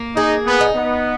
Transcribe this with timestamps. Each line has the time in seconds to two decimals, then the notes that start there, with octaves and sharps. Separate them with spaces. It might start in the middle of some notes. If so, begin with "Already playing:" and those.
Already playing: A#3
0.16 D#4 G#4
0.46 B3
0.61 D#4
0.75 B3